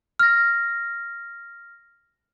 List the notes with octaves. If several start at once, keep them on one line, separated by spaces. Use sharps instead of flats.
F6 A#6